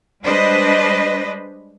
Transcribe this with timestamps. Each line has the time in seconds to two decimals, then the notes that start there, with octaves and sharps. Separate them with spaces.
0.23 G3 G#3 D4 B4 C5 D#5